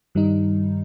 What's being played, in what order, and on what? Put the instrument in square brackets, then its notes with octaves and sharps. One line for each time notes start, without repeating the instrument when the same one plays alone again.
[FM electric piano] G2 D#3 G3 D#4